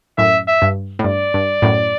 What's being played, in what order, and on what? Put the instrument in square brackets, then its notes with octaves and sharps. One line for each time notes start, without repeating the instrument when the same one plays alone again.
[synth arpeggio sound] F#2 A2 [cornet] E5
[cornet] E5
[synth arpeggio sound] G2
A2
[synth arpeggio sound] G2 [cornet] D5
[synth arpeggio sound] G2
F#2 A2